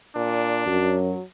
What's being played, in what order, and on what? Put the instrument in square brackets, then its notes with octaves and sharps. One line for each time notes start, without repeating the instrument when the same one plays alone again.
[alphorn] A#2 [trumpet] D4
[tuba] F#2 [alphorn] F#3